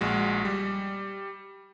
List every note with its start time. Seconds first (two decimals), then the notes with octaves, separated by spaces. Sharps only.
0.01 A#1 G#3 F#4
0.45 G3